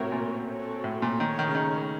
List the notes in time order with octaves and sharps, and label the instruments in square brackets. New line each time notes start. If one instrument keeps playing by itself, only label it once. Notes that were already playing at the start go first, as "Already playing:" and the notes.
Already playing: [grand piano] A2 C3 [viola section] C4 F#4 A#4 C#5
[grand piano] A#2
[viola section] C4 F#4 A4 C#5
[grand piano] A2
A#2
[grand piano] D#3 [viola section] A3 D#4 A#4 C#5
[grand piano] D#3
C#3
D#3